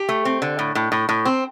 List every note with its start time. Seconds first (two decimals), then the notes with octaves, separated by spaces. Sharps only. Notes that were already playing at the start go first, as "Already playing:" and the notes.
Already playing: G4
0.09 A3
0.25 C4
0.42 D3
0.59 A2
0.75 A2
0.92 A2
1.09 A2
1.25 C4